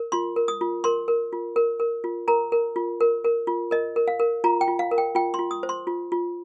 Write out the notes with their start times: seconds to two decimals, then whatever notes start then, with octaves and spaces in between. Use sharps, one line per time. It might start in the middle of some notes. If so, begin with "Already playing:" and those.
Already playing: A#4
0.12 F4 C6
0.36 A#4
0.48 D#6
0.61 F4
0.84 A#4 C6
1.08 A#4
1.33 F4
1.56 A#4
1.80 A#4
2.04 F4
2.28 A#4 A#5
2.52 A#4
2.76 F4
3.00 A#4
3.24 A#4
3.47 F4
3.71 A#4 D#5
3.96 A#4
4.08 F5
4.20 A#4
4.44 F4 A#5
4.61 G5
4.68 F4
4.79 F5
4.91 A#4
4.98 G5
5.15 F4 G5
5.34 F4 C6
5.51 D#6
5.63 C5
5.69 C6
5.87 F4
6.12 F4